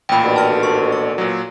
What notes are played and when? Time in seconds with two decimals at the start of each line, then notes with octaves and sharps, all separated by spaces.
0.09 A1 A#2 G5 B5
0.23 D#2 B2 D3
0.36 A5 F6 A#6
0.63 C#6
0.92 D6
1.18 A#2 F#3